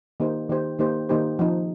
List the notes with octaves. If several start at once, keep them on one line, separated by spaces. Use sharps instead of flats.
D#3 A#3 D#4 G4 C5
D#3 A#3 D#4 G4 C5
D#3 A#3 D#4 G4 C5
D#3 A#3 D#4 G4 C5
F3 C4 D#4